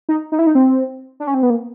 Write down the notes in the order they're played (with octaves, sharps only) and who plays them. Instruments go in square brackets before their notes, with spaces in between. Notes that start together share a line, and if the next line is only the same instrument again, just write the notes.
[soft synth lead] D#4
D#4
E4
D#4
C4
D4
C#4
C4
B3
A#3